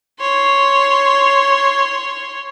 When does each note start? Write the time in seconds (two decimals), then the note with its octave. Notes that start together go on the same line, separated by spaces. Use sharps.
0.20 C#5 C6